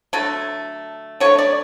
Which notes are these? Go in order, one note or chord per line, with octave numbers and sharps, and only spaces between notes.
D3 F#3 A3 A4
D3 F#3 A3 C#5
D5